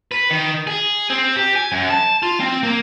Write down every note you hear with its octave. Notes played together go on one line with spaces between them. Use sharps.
B4
D#3
G#4
C4
G4
G#5
F#2
A5
F4
C4
A#3